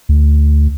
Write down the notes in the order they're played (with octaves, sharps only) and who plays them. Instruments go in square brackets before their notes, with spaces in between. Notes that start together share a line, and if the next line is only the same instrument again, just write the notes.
[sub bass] D2